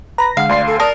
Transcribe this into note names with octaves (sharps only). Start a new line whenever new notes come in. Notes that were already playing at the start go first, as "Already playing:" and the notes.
B4 A#5 B5 A#6
D3 G#3 F5 F#5
D2 D5 C6 C7
A4
A#4 D5 A5 D#6 A#6